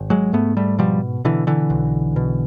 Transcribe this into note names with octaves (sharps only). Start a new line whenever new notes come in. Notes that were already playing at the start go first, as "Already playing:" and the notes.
Already playing: G#1
F#3 G#3
G#2 A3 B3
G3 A3
B2 F3 G3
B2 D3 E3
D3 E3
B1
B2